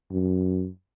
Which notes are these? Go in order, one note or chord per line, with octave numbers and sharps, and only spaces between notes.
F#2